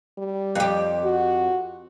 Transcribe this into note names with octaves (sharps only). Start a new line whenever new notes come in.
G3
F2 G4
F#4